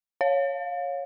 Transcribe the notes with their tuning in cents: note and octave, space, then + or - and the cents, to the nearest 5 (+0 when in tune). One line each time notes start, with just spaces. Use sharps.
C#5 +0 F5 +20